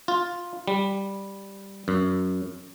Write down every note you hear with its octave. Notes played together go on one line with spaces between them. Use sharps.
F4
G3
F#2